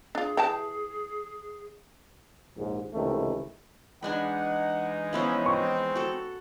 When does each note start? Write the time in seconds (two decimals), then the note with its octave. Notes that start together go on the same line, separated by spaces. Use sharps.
0.15 D4 F4 G#4
0.37 E3 G4 A5
2.56 A#1 D#2 G#2
2.93 C#2 C3 D#3 E3 A3
4.03 E3 G#3 D4 D#4 F#5 G#5 B5
5.13 F3 B3 C#4 E4
5.46 C4 C#6
5.95 F#4 A4